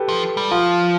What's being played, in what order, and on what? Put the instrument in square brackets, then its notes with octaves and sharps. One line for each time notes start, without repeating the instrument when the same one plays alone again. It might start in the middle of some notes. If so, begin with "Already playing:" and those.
Already playing: [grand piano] G4 A4 B4
[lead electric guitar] F3
G3
[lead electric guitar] F3 [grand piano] F4